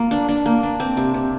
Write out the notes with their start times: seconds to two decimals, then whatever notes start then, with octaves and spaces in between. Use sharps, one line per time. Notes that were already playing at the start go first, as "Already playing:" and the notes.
Already playing: A#3 F4
0.11 D4
0.29 D4
0.46 A#3
0.63 D4
0.80 C4
0.97 C3
1.14 C3